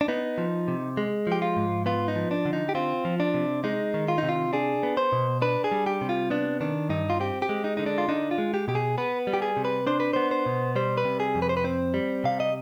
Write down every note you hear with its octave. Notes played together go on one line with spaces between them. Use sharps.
D4
B3 D#4
F3
C3
G#3
F3 G4
F4
G#2
B3 F4
D#4
F3
D4
D3
D#4
G4
C4 F4
F3
D4
C3
G#3 D#4
D#3
F4
D#4
C3
F4
D4 G#4
B3
C5
B2
D4 B4
G#4
G3
G4
C3
F4
B3 D4
D#3 D4
G2 D#4
F4
C4 G4
G4
G#3
D#4
D3 D#4
D4
F4
D4 D#4
F4
G#3
G4
B2 G4
G#4
B3 B4
G3
G4
G#4
C3
B4
D4 C5
B4
B3 C5
C5
B2
G3 C5
B4
C3
G#4
F2
B4
C5
B4
C4 C5
G3
C3 F5
D#5